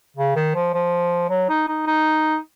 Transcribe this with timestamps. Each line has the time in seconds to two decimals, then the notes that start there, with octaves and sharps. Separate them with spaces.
0.17 C#3
0.36 D#3
0.55 F3
0.74 F3
1.29 F#3
1.49 D#4
1.68 D#4
1.86 D#4